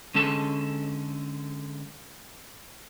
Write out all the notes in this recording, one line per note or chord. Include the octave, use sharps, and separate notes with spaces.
D3 G#3 C#4 A4 A5